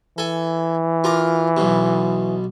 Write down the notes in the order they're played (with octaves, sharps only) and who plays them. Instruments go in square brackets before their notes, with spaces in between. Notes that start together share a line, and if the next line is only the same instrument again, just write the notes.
[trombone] E3 [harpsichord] A4 G#5
[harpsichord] F4 A#4 D6
B1 B2